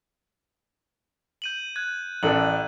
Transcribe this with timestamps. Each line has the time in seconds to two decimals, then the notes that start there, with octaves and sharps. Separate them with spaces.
1.42 G6 D#7 F#7
1.76 F#6 G#6
2.23 A1 A4 D5 F#7